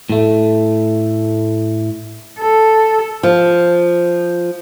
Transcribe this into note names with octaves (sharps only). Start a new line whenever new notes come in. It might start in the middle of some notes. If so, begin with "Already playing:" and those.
A2 A3
A4
F3